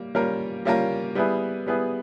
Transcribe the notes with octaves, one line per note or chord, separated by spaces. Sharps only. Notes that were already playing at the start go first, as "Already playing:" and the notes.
Already playing: G3 A#3
G3 A#3 C#4 F4 A#4
G3 A#3 C#4 F4 A#4
G3 B3 E4 G#4 B4
G3 B3 E4 G#4 B4